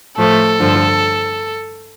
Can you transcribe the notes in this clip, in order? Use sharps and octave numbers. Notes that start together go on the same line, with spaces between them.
A2 F3 A3 A4
G2 D3 F3